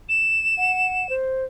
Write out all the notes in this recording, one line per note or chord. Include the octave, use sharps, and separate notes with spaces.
E7
F#5
C5